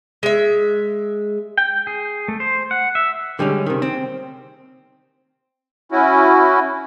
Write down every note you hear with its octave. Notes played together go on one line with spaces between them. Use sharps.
G#3 E5
G5
G#4
A3
C5
F#5
E5
D3 G3 G#3 C#4
C3 D#3
C4
C#4 E4 F#4